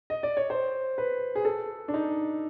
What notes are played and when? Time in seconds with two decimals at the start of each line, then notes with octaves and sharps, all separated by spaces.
0.10 D#5
0.23 D5
0.37 C#5
0.50 C5
0.98 B4
1.35 G#4
1.45 A4
1.88 D4
1.94 D#4